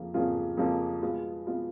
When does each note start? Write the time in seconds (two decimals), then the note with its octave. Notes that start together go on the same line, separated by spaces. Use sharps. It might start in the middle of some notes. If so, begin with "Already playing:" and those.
Already playing: F2 C#3 F3 A#3 F4
0.14 F2 C#3 F3 A#3 F4
0.57 F2 C#3 F3 A#3 F4
1.02 B2 G#3 B3 F4
1.47 B2 G#3 B3 F4